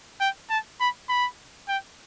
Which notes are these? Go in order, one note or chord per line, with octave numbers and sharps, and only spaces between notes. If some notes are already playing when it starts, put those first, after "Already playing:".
G5
A5
B5
B5
G5